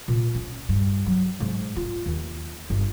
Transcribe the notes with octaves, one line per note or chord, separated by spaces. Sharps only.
A#2
C#4
G2
F#3
G#2
F4
D#2
G1